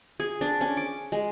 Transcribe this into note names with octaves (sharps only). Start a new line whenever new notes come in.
G#4
D4
C#4
D6
G#3